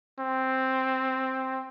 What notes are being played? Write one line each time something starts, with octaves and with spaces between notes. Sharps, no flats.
C4